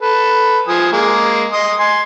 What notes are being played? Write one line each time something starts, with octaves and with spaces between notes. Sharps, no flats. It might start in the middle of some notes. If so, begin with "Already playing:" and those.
A4 B4
F3 G#5 D#6
G#3 A#3 G#4
D#5 C6 D#6
G#5 C6